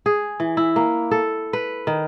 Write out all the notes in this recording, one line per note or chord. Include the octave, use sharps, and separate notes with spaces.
G#4
E3
E4
A#3
A4
B4
D#3